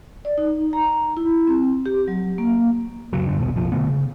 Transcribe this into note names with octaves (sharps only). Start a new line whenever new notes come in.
D5
D#4
A#5
A#5
E4
C4
G4
F#3
A#3
F#1 C#2 F#3
G2 D3
A#1 E2 B2 B3
F#1 B1 F3
B2 D3 A3 B3
C#3